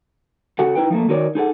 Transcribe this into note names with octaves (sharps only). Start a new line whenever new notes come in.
C#3 F#4 A4 F#5
D#4 E4 B4 G5
F3 A3 A#3
D#3 D#4 F#4 A#4 C#5 D5
D#4 G#4 A4 F#5